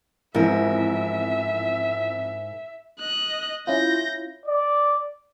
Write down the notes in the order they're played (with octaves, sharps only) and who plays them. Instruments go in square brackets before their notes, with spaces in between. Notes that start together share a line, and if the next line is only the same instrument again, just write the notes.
[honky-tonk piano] A1 F2 E4 [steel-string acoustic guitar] G#2 A#4 [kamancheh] E5
[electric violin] D#5 F#6
[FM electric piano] C#4 E4 F4 [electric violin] G6 A#6
[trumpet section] D5